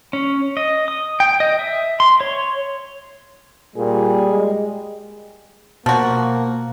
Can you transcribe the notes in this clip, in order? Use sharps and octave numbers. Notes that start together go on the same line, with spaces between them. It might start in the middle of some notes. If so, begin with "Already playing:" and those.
C#4
D#5
D#6
G5
D#5
E5
C6
C#5
A#2 G3 G#4
G#3
B2 F3 A#3 F#4